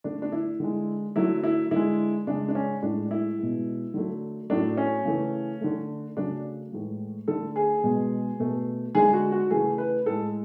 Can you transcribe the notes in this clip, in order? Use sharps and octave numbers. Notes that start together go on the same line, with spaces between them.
D3 A3 D4
D4
E4
D3 G#3
D3 F#3 A3 E4
E4
D3 G#3 E4
C#3 G#3 D4
D4
C#4
A2 G#3 D4
E4
B2 G#3
D3 F#3 A3
A2 F#3 A3 D4
C#4
C#3 E3 A3
D3 A3
C#3 F#3 A3 D4
A2 E3 G#3
D3 A3 A4
G#4
B2 G#3
B2 A3
D3 G#3 G#4
F#4
F#4
C#3 E3 A3 G#4
B4
A2 G#3 A4